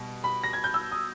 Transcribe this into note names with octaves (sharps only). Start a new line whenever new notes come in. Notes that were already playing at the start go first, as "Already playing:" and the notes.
Already playing: B2 G3
B5
A#6
G#6
G6
E6
D#6